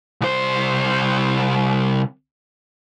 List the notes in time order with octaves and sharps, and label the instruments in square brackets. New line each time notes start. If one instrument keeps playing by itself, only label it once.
[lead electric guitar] C2 C5